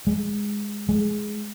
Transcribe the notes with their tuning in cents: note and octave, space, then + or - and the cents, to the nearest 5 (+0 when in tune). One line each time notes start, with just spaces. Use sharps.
G#3 -5
G#3 +10